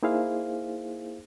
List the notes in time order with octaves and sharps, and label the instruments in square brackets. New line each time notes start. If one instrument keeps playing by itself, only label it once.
[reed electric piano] A#3 D#4 E4 G#4 C5 F5